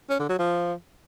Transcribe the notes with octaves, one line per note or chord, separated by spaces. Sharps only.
C#4
D3
F#3
F3